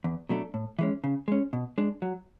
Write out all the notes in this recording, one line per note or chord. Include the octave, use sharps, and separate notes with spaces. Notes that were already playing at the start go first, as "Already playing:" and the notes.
E2
B2 F#3 A3 D4
A2
E3 G#3 C#4
C#3
G#3 C#4
B2
G#3 D4
F#3